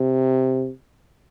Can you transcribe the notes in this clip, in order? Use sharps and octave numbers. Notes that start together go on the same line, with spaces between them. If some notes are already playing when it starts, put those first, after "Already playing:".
Already playing: C3